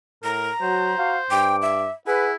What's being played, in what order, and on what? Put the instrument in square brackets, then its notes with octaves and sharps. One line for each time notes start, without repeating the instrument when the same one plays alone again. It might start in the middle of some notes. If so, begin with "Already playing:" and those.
[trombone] A2 [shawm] A#4 [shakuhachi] A#5
[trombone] F#3 [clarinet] F#4 [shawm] C5
[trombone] F#4 [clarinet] F5
[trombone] G2 [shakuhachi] G5 [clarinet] D6
[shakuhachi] E5
[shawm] E4 [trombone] G#4 [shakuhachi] B4 [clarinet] F#5